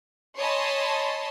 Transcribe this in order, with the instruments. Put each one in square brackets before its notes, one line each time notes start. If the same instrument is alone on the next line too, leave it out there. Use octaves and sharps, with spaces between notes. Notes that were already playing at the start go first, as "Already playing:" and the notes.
[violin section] C#5 D#5 G#5 A5 B5 C6